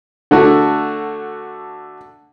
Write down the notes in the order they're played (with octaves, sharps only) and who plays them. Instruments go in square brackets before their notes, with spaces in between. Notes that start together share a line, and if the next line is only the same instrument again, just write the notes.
[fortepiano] D3 A3 F#4